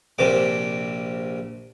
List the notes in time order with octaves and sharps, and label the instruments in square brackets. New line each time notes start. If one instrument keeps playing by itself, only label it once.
[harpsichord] A#1 C3 D6